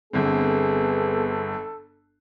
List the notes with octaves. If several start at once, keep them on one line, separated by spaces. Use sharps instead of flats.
G1 D3 B3 C4 G#4 A4